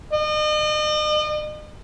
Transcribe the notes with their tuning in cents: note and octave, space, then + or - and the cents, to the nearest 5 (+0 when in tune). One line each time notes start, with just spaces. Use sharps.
D#5 -40